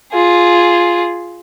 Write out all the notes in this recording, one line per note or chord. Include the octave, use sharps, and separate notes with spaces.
F4 G#4